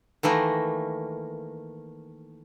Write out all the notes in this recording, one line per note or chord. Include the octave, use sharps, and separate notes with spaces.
D#3 E3 A3 A#3